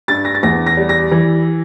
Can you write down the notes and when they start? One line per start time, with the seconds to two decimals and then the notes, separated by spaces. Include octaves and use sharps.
0.08 G2 A6
0.25 A#6
0.35 A6
0.43 E2 A#6
0.66 A#6
0.77 G3
0.89 A#6
1.12 E3